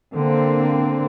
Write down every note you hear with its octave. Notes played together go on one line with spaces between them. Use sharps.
D3 A#3 C4